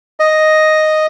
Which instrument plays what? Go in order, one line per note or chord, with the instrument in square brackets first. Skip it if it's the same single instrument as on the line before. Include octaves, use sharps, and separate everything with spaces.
[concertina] D#5